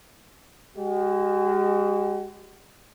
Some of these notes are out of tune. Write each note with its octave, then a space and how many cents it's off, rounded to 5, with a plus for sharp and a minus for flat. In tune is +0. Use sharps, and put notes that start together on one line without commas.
G#3 -30 F#4 +35